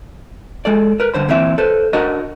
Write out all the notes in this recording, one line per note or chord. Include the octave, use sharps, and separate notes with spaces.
G#3 A4 D5
A#4 B4
G2 D3 C5 B5
A#2 E3 C4 E4 E5
A4 B4 C5
D4 F#4 A#4 D#5